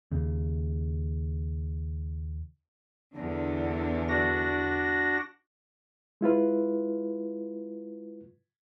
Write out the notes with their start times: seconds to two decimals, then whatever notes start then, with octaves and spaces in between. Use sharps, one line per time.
0.11 D#2 C#3
3.17 E2 D3
4.09 D4 F#4 A#6
6.21 G#3 E4 F4 B4